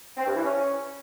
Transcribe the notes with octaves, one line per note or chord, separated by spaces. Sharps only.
C4
G2
E3
C#4